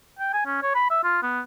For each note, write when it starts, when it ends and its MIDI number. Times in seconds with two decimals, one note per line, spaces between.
0.19 0.32 79
0.33 0.41 80
0.46 0.59 61
0.62 0.71 73
0.75 0.90 83
0.90 1.03 76
1.04 1.22 65
1.23 1.41 59